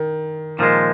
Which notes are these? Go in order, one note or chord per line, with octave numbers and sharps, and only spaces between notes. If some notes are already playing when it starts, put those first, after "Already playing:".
Already playing: D#3
A#2 D#3 F3 G#3